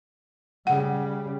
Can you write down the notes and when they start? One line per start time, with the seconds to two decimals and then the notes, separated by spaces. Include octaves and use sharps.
0.67 C#3 G3 F#5